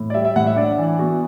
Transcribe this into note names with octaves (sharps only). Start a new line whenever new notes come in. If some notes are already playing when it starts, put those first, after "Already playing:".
Already playing: A2
D5
G3 E5
E5
A2 F#5
E5
D4 D5
E3
B3 F#4